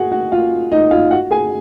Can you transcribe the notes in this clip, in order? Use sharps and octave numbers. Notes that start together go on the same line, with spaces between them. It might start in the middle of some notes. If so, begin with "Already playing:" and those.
Already playing: F#4 G#4 F#5
F#4 F#5
F4 F5
D#4 D#5
F4 F5
F#4 F#5
G#4 G#5